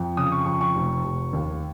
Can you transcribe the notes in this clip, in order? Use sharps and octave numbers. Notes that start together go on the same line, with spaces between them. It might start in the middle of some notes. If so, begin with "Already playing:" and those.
Already playing: F2
C#3 D#6
C#6
F2 C#6
C#6
F1
F1
D#2